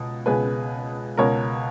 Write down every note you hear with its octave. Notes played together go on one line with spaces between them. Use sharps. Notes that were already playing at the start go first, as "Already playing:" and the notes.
Already playing: C#2 B2
C#2 B2 G#4 B4
C#2 B2 A#4 C#5